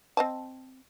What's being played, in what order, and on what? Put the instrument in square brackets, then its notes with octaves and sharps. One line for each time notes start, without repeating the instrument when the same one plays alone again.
[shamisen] C4 D#5 A5